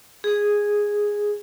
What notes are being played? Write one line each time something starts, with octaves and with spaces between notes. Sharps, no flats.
G#4